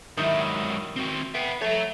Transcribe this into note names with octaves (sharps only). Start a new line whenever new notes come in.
G#2 D#3 F#3 G3 E4
C4 F#4
B3 E5 G5
A3 C#5 A#5